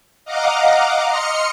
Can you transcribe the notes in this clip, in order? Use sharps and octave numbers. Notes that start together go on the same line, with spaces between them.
D#5 F5 F#5 A#5 D6
D#5 C6 F6 C#7